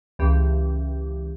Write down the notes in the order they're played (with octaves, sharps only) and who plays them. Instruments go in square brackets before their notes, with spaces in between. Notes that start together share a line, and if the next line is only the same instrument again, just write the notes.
[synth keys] C#2 E3 G4